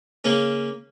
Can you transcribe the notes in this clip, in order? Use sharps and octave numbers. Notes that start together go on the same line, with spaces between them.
C#3 A#3 C#4